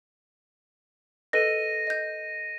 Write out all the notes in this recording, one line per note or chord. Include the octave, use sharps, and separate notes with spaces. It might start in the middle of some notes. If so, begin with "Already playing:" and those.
A4 B4 D#5 A#6 D#7
D#5 G6